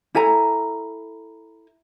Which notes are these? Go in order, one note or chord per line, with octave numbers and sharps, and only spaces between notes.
E4 A4 G#5 A#5